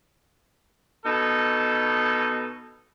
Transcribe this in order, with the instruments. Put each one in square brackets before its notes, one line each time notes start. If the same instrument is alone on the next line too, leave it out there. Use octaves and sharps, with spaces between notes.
[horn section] B2 D#4 A4